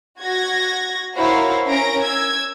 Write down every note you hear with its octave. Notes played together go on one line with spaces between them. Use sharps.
F#4 G#6 A#6
E4 F#4 A#4 C5 C#5 F5
C#4 A#4 A#6 D7
E6 G#6